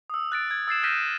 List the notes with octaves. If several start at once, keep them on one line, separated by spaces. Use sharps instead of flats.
D#6 E6
F#6 A6 D7
G#6
E6 A6 C7 E7
F6 G6 A#6 B6 D#7 E7